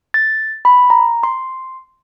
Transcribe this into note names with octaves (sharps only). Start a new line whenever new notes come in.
A6
B5
A#5
C6